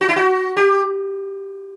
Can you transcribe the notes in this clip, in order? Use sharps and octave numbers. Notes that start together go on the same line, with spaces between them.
F#4
E4
F#4
G4